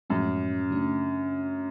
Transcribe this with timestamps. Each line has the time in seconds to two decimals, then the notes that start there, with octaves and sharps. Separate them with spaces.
0.10 F#2 A2 F3 G#3 C#4
0.71 C#3 F#3 A3 D4